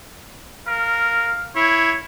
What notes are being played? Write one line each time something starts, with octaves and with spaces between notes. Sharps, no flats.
A#4 F5
E4 C#5